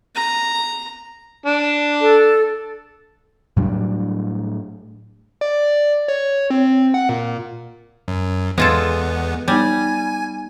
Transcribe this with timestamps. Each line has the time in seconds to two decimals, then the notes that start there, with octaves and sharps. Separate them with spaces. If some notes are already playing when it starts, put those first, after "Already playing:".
0.15 A#5
1.46 D4
2.01 A4
3.56 A2 F#3 G3 D4
5.41 D5
6.08 C#5
6.50 C4
6.94 F#5
7.09 A#2
8.08 F#2
8.58 E2 G#3 B3 F4 A4
9.48 G3 B3 D#4 G#5